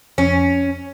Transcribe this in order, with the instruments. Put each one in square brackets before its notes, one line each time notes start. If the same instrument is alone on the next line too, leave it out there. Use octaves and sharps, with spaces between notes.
[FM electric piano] F2 [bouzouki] C#4